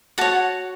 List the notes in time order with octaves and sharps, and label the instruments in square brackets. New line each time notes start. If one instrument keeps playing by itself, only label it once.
[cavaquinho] F#4 C#5 F#5 A5